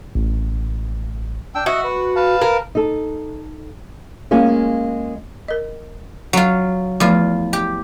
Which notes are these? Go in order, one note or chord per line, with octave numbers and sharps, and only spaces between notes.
A1
D4 G5 E6
F#4 D#5 E5 F#5
B4
B4 F5 A5
A#4
D#4 A4
G#3 A#3 C#4 F4
A#4 D#5
F#3 F4
E2 F3 A3 F4
G4